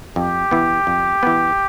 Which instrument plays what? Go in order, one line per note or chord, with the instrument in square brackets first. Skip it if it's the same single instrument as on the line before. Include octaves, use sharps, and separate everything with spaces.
[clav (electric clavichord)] F2 [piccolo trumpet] G4
[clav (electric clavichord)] E3 B3
F2
E3 B3